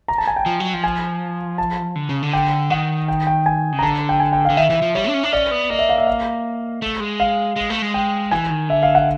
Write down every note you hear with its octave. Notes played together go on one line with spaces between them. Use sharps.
A#5
A5
G#5
G5
F3
F#3
F3
G#5
A5
D3
C#3
D3
G5
D#3 F#5
G5
G5
G#5
C#3
A#5
D3 A5
G5
G#5
G5
F5
D3
D#3 E5
E3
F3
G3 C#5
G#3
D4
C#4
D4
C#4 D5
B3
A#3 D#5
E5
F5
E5
F5
A3
G#3
F5
G#3
A3
G#3
G5
E3 G#5
D#3
D3 E5
F5
F#5